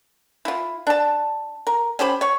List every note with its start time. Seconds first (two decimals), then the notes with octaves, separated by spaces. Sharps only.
0.45 E4 F4
0.87 D4 A5
1.67 A#4
1.99 C#4 G4 C5 B5
2.21 C#5 C#6